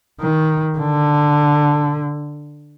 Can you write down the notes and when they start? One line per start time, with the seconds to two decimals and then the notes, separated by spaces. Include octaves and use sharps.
0.21 D#3
0.78 D3